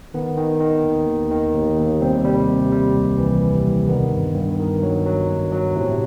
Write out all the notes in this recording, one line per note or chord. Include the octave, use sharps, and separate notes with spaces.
D#3 B3
D#3
D#3
D#2
D#2
D#3
D#2
D#2
C3 G3 C4
G3
C3
G3
C2
E3
E3
C2
D#3 B3
G2
G2
D#3
F#3
F#3
G2
F#3
A2 C3 C4